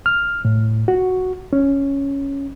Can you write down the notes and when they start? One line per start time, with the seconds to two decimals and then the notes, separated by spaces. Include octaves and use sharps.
0.06 F6
0.45 A2
0.88 F#4
1.53 C#4